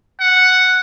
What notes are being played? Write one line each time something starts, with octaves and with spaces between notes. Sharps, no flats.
F#5